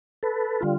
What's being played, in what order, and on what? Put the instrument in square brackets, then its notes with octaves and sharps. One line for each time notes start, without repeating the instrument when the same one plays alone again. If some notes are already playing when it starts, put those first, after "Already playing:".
[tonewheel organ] A4 B4
D3 G3 F4